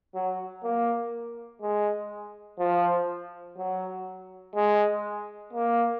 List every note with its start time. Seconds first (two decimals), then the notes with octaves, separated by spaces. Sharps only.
0.15 F#3
0.64 A#3
1.62 G#3
2.59 F3
3.58 F#3
4.55 G#3
5.53 A#3